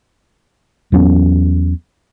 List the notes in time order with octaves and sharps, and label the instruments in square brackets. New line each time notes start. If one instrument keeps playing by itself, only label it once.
[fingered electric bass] E2 F#3 B3 C#4